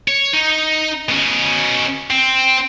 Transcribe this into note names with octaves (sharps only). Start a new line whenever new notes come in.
C#5
D#4
B2 C#4
C4